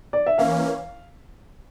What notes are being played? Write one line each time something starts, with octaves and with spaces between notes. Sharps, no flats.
D5
E5
E3 A#3 C#4 F5